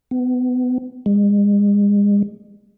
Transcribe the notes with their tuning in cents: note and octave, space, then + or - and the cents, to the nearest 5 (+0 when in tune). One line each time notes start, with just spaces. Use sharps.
B3 +25
G#3 -35